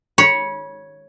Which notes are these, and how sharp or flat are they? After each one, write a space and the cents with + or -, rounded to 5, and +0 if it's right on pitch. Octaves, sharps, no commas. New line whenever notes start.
C#5 +0 B5 -30